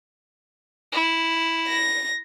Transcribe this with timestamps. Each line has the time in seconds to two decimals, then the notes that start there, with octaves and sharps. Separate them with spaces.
0.93 E4
1.68 A#6